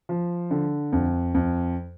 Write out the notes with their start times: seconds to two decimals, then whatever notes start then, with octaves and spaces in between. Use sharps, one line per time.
0.09 F3
0.51 D3
0.92 F2
1.34 F2